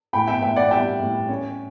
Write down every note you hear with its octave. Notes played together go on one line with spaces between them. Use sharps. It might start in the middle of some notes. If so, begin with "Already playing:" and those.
A2 G5 B5
E5 G5
A2 E5 G5
D5 F#5
G3 E5 G5
A2
C#4